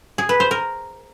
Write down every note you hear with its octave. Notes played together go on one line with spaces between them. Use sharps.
G#4
B4
C5
A#4